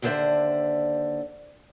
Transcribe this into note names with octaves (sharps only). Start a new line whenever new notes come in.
D#2 D3 D4 C5 D5 E5